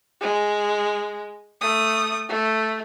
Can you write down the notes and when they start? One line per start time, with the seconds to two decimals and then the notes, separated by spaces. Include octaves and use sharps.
0.21 G#3
1.61 A3 D#6
2.29 A3